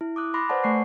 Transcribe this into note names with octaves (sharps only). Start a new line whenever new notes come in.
E4
D6 D#6 F#6
B5 C6 D6 F#6 A6 A#6
B4 C5 D5 F#5 A5
A3 D5 G#5 C#6 C7